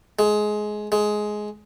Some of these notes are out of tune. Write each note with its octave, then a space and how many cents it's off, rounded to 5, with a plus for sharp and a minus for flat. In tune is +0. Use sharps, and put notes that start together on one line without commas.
G#3 +20
G#3 +15